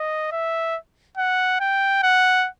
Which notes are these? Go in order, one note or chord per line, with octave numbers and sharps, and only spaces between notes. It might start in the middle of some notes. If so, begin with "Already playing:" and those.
Already playing: D#5
E5
F#5
G5
F#5